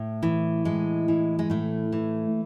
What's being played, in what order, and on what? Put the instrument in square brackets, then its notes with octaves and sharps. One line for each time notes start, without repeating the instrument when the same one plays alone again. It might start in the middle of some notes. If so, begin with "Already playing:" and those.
Already playing: [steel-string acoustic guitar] A2
E3
A2 G#3
E3
G#3
A2 A3
E3